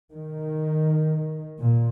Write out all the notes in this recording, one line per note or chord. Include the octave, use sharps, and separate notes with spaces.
D#3
A#2